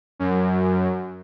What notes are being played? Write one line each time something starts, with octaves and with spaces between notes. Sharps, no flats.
F#2